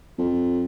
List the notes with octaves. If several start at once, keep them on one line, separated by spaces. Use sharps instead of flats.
F2